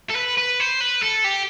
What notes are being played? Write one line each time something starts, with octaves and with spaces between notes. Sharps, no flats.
A4
B4
B4
C5
B4
A4
G4